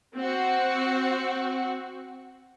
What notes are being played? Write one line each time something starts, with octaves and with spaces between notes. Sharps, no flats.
C4 F#4